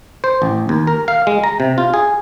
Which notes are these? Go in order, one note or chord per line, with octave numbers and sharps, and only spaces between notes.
C5
A1
D#2
A#4
F5
G#3
A#5
C3
F4
G#4